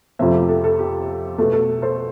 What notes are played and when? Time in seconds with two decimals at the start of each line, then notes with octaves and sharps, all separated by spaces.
0.19 F2 C3 F3 A3 C5 E5
0.34 G4
0.49 A4
0.64 A4
0.79 G4
1.38 B2 A3 A4
1.53 A4
1.82 A4 C5